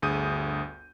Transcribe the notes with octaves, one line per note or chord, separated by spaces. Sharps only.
G1 D2 G#4 D#6 G6 D#7